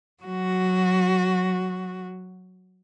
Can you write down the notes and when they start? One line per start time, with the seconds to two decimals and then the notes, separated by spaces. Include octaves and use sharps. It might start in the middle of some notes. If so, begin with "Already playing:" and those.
0.23 F#3 F#4